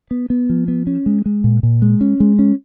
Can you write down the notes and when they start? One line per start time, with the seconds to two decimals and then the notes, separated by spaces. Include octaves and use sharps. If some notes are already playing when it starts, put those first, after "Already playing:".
0.11 B3
0.30 B3
0.49 F3
0.68 B3
0.87 C#4
1.06 G#3
1.26 G#3
1.44 A#2
1.63 A#2
1.82 G#3
2.01 C#4
2.20 G#3
2.39 C#4